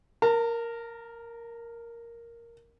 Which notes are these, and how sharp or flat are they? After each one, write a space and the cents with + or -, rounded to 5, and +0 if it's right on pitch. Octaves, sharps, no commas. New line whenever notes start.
A#4 +0 A5 +45